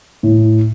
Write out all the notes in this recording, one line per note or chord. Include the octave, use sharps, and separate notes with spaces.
A2